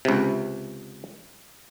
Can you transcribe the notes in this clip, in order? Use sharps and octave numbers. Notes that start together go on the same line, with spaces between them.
C#2 C3